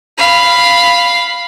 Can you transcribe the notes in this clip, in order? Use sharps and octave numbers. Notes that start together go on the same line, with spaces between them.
F5 B5